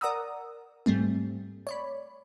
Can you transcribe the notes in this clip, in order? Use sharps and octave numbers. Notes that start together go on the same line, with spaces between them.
A#4 D5 F#5 A#5 D#6 E6
G#2 G3 A3 C4
C#5 D5 B5